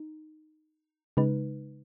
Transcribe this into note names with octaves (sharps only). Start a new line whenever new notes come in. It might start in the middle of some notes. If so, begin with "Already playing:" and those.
Already playing: D#4
C#3 G#3 D#4 B4